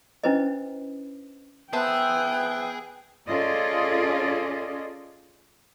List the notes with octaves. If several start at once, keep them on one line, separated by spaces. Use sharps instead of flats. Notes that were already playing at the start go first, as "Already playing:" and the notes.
C#4 D4 E4 B4 C5 D#5
B3 G#4 C5 E5 G5 A5
C#4 F4 G#4 A4 D5 D#5